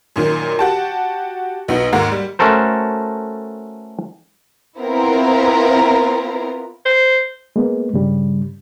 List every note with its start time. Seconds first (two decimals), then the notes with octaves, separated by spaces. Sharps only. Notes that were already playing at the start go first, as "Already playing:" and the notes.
0.16 F#2 A#2 D#3
0.59 F#4 G4 A5
1.68 B1 B3 D#4
1.93 D#2 G#2 A#3 F#4
2.11 G3
2.39 A3 C#4 F#4 A4 A#4 C5
4.79 B3 C4 E4 F4 A#4
6.85 C5
7.56 G#3 A#3 B3
7.94 G2 C#3 G3